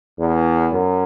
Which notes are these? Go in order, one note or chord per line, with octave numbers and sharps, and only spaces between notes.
E2
F#2